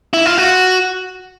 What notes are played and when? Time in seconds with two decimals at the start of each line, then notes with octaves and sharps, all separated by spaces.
0.13 E4
0.26 F4
0.38 F#4